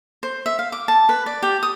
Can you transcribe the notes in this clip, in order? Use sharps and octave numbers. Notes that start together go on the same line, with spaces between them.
C5
E5
F5
D6
A5
B4
D5
G4
D#6